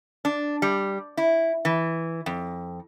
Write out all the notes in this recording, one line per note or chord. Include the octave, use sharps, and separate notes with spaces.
D4
G3
E4
E3
F2